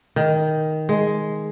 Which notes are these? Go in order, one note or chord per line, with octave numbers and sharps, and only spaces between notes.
D#3
G#3